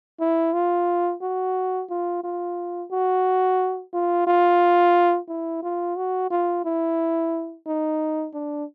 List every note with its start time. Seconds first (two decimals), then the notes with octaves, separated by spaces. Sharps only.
0.20 E4
0.53 F4
1.22 F#4
1.90 F4
2.24 F4
2.91 F#4
3.94 F4
4.27 F4
5.29 E4
5.63 F4
5.97 F#4
6.31 F4
6.65 E4
7.67 D#4
8.34 D4